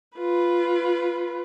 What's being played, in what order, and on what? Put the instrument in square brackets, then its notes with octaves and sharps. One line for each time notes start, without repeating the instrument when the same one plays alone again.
[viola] F4 B4